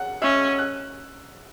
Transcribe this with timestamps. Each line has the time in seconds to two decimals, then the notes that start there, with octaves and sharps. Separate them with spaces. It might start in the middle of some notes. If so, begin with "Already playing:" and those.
Already playing: F#5 F#6
0.22 C#4 E5 E6
0.59 F#6